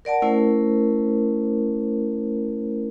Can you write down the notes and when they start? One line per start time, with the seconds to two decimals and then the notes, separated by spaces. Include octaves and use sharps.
0.05 A#4 D5 F#5 A5
0.22 A3 C#4 E4 A#4 C5